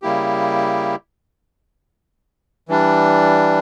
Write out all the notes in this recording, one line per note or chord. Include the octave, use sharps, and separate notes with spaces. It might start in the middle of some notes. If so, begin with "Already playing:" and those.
C#3 G3 A#3 E4 G4
E3 G3 D4